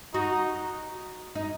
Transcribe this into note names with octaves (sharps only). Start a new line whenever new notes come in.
D#4 F#4
D#4